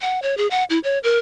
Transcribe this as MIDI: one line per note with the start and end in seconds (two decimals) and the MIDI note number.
0.01 0.20 78
0.22 0.35 73
0.38 0.47 68
0.51 0.64 78
0.70 0.79 64
0.84 0.99 73
1.04 1.19 70